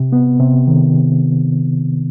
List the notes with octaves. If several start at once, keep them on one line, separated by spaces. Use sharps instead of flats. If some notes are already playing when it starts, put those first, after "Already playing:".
Already playing: C3
B3
C3
D#3
C3